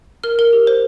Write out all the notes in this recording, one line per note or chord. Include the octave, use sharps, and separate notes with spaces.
A#4 F6
A#4
G4
C5